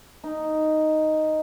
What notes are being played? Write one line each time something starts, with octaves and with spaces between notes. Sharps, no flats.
D#4